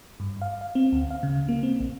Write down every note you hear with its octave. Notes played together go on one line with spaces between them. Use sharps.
G2
F5
F5
C4
D2
F5
C#3
A#3
C4
A#1